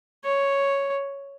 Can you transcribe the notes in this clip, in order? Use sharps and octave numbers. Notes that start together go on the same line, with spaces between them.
C#5